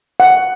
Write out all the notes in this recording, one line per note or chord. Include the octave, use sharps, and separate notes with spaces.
F#5